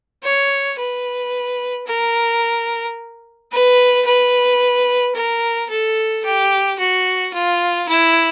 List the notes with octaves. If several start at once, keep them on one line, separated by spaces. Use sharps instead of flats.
C#5
B4
A#4
B4
B4
A#4
A4
G4
F#4
F4
E4